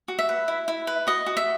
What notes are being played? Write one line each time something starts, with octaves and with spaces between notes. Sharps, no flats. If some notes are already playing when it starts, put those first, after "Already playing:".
F#4
E5
B4
E4
E4
B4
F#4 D#5
F#4
E5